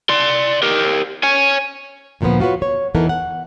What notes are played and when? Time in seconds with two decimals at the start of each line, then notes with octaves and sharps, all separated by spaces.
0.09 D5 C6
0.62 G4 A#4
1.23 C#5 G#5
2.21 D2 A#2 E3 F3 B3
2.40 F4 F#4 G#4 B4 C#5
2.62 C#5
2.95 E2 E3 B3 D#4 A4 A#4
3.09 F#5